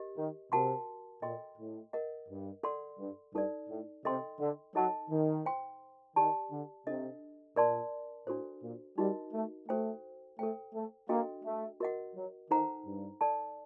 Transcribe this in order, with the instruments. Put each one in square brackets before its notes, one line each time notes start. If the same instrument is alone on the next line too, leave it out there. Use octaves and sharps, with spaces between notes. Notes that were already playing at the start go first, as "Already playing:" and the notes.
Already playing: [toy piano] G4 A#4 D#5
[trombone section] D#3
[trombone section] C3 [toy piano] F#4 A#4 F#5 A5 C6
[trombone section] A#2 [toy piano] A4 D#5 G5 C6
[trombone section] A2
[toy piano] A#4 D#5 F#5
[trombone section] G2
[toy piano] A4 D5 F#5 C6
[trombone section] G2
[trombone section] G2 [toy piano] D#4 A4 D5
[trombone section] A2
[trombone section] C3 [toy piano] A4 D#5 G5 C6
[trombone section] D3
[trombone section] F#3 [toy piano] D#4 A4 D#5 A5
[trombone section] D#3
[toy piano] C5 G5 C6
[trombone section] D#3 [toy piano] G4 D5 A5
[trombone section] D3
[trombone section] C3 [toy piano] D4 A4 D#5
[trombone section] A#2 [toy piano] A#4 D5 A5 C6
[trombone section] A2 [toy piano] D4 F#4 A4 C5
[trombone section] A#2
[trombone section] G3 [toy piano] D#4 F#4 A#4 D#5
[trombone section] A3
[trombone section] A3 [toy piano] F#4 A4 C5 G5
[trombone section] A3 [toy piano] A4 C5 G5
[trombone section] A3
[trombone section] A#3 [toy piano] D4 F#4 A4 D#5 G5
[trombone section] A3
[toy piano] F#4 A#4 D#5 F#5
[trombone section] F#3
[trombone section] D#3 [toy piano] D#4 A4 C5 F#5 A#5
[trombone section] G2
[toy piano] A4 D5 A5